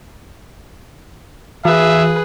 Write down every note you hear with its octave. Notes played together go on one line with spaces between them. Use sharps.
E3 G#4 B4 E5